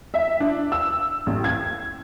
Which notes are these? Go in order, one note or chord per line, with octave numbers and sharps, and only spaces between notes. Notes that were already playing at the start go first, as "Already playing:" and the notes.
E5
D4
E6
A1
G#6